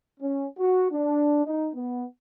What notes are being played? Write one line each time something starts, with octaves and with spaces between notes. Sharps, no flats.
C#4
F#4
D4
D#4
B3